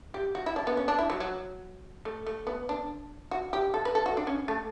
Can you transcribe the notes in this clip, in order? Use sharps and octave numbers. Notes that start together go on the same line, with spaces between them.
G4
F#4
E4
D4
B3
C#4
D4
E4
F#3
F#3
A3
A3
B3
D4
F#4
G4
A4
B4
A4
F#4
D4
C#4
A3